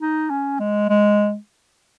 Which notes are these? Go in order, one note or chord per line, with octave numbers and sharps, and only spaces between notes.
D#4
C#4
G#3
G#3